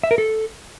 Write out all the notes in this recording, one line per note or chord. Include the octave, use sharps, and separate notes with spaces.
E5
A#4
A4